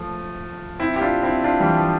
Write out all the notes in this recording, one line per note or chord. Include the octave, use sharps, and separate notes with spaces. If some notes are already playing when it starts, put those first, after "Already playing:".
Already playing: F3 A3
C4 E4
G4
D4 F4
C4 E4
D4 F4
E3 G3
F3